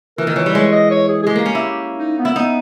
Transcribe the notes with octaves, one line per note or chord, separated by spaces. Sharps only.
E3 A#4
D#3
E3 C#5
G3
G#3 C#5
D#5
C#5
G#4
G#4
G#3 G4
A#3
C#4
E4
D#4
B3
E4
B3 D#4